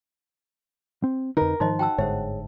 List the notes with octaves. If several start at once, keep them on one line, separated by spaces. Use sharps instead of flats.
C4
F2 D3 D#4 A#4 B4
G#2 D#3 F3 D#4 C5 D#5 C6
F#4 G5 A5 E6
G1 G#2 D3 G#4 C5 C#5 E5